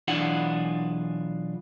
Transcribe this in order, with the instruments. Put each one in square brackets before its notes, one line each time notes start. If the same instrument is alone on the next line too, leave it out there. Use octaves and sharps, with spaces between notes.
[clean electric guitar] B1 E3 D4 F4 G#4 F#5